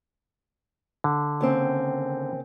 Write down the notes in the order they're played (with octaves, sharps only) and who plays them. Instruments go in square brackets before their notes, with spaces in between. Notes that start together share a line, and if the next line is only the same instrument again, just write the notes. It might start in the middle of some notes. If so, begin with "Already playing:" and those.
[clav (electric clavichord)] D3
[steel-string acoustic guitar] D#2 C#3 C4